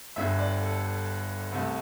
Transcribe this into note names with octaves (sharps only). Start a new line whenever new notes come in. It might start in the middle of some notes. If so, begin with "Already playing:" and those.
G1 G2 D3 E5
D5
A4
C2 C3 A3